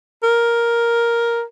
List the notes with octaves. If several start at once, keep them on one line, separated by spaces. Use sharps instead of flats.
A#4